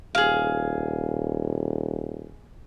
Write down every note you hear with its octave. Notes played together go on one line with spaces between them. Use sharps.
D#1 G#4 F5